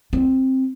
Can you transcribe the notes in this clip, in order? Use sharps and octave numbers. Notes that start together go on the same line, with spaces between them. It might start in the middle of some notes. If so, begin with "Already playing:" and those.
C4